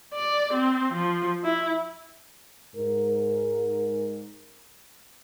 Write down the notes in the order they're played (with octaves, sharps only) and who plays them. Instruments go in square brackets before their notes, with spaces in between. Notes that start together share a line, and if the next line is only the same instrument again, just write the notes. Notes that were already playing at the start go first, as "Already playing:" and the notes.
[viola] D5
C4
F3
E4
[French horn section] G#2 A#4